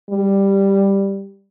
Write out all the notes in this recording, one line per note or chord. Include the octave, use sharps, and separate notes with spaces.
G3